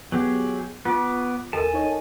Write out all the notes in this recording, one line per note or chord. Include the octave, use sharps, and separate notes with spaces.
F#3 B3 G4 G#4
B3 F4 C#6 D6
D#2 A4 A#4 G#5 A5
D#4 C#5 D#5